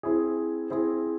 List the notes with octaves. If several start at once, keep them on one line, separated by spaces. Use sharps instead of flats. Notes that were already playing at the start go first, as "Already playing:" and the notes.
C4 E4 G#4
C4 E4 G#4